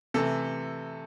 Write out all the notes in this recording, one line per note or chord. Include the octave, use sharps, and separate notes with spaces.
C3 E3 A3 A4